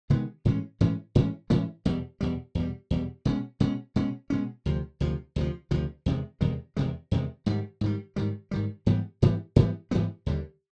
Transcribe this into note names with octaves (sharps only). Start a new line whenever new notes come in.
C3 D#3 G#3 B3
A2 E3 G#3 C#4
A2 E3 G#3 C#4
A2 E3 G#3 C#4
A2 E3 G#3 C#4
E2 B2 G3
E2 B2 G3
E2 B2 G3
E2 B2 G3
B2 G#3 C#4
B2 G#3 C#4
B2 G#3 C#4
B2 G#3 C#4
D2 C3 F3
D2 C3 F3
D2 C3 F3
D2 C3 F3
E2 C3 D#3 G#3
E2 C3 D#3 G#3
E2 C3 D#3 G#3
E2 C3 D#3 G#3
G#2 D#3 G3
G#2 D#3 G3
G#2 D#3 G3
G#2 D#3 G3
G#2 E3 G3 B3
G#2 E3 G3 B3
G#2 E3 G3 B3
G#2 E3 G3 B3
D#2 D3 G3